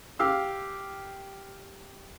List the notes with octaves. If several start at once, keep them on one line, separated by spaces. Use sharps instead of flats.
G4 F5 E6